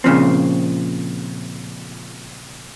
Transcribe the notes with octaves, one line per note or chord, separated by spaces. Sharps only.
A#2 C#3 F3 C4